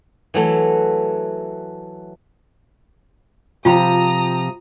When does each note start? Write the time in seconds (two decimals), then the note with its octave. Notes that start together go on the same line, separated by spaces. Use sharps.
0.34 E3 F#3 A3 A4
3.65 C3 F3 F4 G5 A#5 B5 D#6